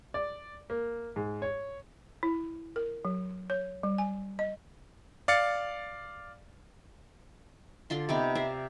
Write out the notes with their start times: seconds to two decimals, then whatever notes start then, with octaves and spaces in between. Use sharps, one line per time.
0.14 D5
0.70 A#3
1.16 G#2
1.42 C#5
2.23 E4
2.76 A#4
3.05 F#3
3.50 C#5
3.83 G3
3.98 G#5
4.39 D#5
5.28 D5 F5 A6 C#7
7.90 D3 D4 F4 C6
8.09 C3 B3 D#4 G4
8.35 D5 E5 F5 A#5